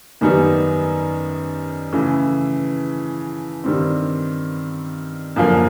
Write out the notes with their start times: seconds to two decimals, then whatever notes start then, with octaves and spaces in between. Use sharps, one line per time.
0.21 F#2 D#3 G3 B3 D#4
1.92 C#3 E3 A3
3.64 G2 D#3 G3 C4
5.36 F#2 D3 F3 A#3